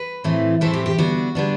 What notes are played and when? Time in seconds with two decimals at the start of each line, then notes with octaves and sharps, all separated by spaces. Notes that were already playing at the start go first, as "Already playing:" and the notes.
Already playing: B4
0.24 A2 E3 A3 C4
0.61 A2 E3 A3 C4 A4
0.73 G4
0.86 G4
0.98 D3 G3 B3 D4 F#4
1.35 D3 G3 B3 D4